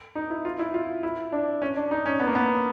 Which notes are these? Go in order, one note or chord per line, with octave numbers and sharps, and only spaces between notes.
D#4
E4
F4
E4
F4
E4
D4
C#4
D4
D#4
C#4
B3
A#3
B3